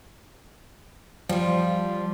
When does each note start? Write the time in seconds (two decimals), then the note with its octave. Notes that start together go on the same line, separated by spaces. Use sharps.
1.29 F3 G3 F4